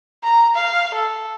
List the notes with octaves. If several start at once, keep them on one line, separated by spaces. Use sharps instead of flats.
A#5
F5
A4